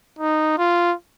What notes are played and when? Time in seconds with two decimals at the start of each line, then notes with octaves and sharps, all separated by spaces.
0.19 D#4
0.58 F4